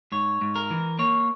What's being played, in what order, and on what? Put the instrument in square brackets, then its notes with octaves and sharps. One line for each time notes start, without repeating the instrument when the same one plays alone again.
[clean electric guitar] G#2 C#5
G#2
A#4
E3
A#3 C#5